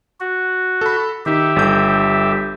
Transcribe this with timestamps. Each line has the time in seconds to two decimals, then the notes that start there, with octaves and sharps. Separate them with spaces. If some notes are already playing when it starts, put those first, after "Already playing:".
0.20 F#4
0.81 A4 B5
1.26 D#3 D#4 G4 E5
1.56 G1 A4 G6